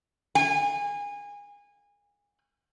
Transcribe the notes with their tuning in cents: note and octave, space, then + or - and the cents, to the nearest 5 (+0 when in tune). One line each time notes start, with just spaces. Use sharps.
G#5 -25